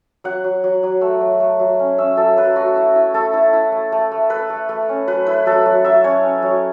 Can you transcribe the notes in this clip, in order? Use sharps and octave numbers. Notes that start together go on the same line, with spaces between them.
F#3 F#5
F#3
F#3
F#3
A3
F#3
A3
F#3
C#4
C#4 E5
F#3 A4
F#3 B4
A3 F#4
E4
E4
A3 A4
E4
E4
A3
A3
A3
A3 B4
A3
A3
C#4
F#3 B4
E4 B4
F#3 A4
F#3
F#3 E5
C#4 C#5
C#4
F#3